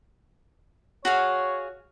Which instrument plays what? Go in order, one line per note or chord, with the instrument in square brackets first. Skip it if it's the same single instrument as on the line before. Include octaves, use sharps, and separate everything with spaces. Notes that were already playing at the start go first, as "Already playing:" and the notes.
[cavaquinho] F#4 G#4 F5 [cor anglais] C#5